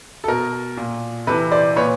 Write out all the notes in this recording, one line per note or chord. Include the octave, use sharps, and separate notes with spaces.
A4
B2 A#4
A#2
C3 E3 A4 B4
C5 D5
A#2 B4 C#5